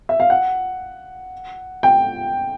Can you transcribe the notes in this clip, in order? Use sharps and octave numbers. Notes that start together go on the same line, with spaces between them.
E5
F5
F#5
G5